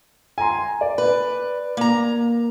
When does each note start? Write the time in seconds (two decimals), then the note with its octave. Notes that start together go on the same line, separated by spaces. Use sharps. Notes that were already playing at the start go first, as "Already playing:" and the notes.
0.38 G#5 A#5 C6
0.81 D5
0.98 B4
1.77 A#3 A#5